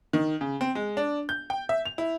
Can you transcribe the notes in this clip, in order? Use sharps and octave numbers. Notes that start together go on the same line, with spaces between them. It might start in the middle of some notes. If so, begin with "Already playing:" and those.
D#3
C#3
C4
G#3
D4
G6
G5
E5
F7
E4